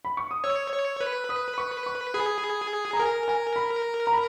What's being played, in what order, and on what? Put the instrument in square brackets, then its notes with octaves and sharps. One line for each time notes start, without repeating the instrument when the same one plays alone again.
[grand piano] B5
C#6
D#6
[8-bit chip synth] C#5 [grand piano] E6
[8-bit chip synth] C#5
B4
[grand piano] D#6
C#6
C#6
[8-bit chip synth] G#4 [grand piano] B5
[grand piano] A#5
[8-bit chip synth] A#4 [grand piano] G#5
[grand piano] G#5
B5
A#5
B5